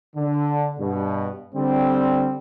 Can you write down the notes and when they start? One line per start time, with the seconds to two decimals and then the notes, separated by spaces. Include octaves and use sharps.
0.16 D3
0.79 G2 B2
1.55 D3 G3 C4